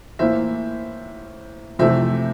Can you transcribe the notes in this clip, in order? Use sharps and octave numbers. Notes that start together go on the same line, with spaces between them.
A2 E3 A#3 C5 E5
F2 C3 E3 A3 C5 E5